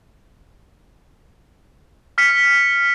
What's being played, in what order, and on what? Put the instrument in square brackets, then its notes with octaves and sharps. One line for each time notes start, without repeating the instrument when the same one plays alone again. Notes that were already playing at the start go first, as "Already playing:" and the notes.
[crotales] F6 B6 C#7